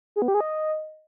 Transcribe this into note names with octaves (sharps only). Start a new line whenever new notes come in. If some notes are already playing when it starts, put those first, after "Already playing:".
G#4
B3
G4
G#4
D#5